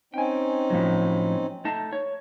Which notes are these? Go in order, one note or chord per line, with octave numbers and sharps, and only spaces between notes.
C4 C#4 D#4 G5 G#5
A2 F3 F#3
A3 D#4 A5
C#5